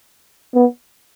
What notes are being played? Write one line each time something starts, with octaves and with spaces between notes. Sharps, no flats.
B3